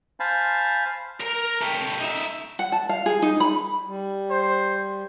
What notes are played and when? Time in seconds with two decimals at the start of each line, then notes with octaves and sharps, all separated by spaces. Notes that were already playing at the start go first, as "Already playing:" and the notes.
0.20 C5 F5 G#5 A5 B5
1.20 A#4 A#5
1.62 A3 G4
1.99 D#4 E5
2.59 F#5
2.72 A5
2.89 F5
3.06 G#4
3.22 D#4
3.40 B5
3.87 G3
4.31 C5